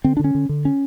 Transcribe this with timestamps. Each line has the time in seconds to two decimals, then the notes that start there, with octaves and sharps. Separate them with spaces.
0.04 D3 C4
0.17 D4
0.19 D3 C#4
0.35 D3
0.49 D3
0.65 C#4